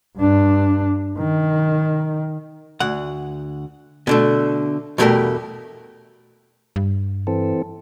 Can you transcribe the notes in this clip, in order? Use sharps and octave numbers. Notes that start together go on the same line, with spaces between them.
G2 D4
D#3
D2 F#5
B2 D3 A3
E2 G2 B2 A3 G4 A#4
G2
E3 C4 A4